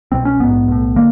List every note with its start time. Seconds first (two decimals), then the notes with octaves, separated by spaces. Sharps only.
0.12 C2 B2 C4
0.25 C#4
0.39 A#1 G#2 B3
0.68 B1 A2
0.96 D3 A#3